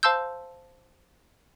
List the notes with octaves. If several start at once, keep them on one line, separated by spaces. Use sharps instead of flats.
C5 F5 A5 C6 E6 G6